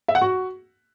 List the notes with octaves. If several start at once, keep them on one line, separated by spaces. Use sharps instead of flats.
E5
F#5
F#4